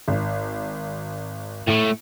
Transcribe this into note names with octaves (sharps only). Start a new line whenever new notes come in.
G#1
A2 A3